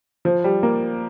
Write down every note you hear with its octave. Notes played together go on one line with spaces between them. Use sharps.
F3
G3
A#3